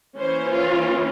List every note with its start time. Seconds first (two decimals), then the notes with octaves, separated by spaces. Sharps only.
0.18 E3 A#3 C#4 C5
0.50 F4